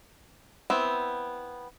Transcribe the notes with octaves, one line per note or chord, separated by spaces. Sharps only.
B3 C4 E4